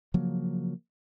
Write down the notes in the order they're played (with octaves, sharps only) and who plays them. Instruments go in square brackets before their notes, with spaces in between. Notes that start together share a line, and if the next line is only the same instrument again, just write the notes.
[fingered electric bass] C#3 F3 F#3 A#3